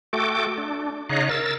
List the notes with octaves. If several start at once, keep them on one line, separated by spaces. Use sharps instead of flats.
A3 F#4 A4 G5 D6
D4
C#3 D#4 C#5 D#5 F5 F#6
A#4 E6 A6